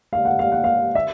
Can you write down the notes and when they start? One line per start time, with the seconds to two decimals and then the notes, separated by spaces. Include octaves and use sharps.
0.13 F5
0.25 F#5
0.39 F5
0.52 F#5
0.64 F5
0.95 E5